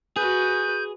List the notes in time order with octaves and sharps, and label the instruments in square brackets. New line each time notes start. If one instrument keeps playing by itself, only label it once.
[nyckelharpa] F#4 B4 [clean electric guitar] G#4 [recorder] G6